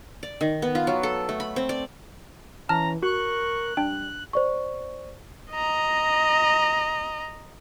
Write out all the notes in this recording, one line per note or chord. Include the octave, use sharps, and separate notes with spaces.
D5
D#3
B3
F4
F#3
A4
A3
B5
C4
D5
E3 C#4 A5 A#5 F6
F#4 A#4 C#6 F#6
G3 D4 G5
C5 D5 C#6
D#5 A#5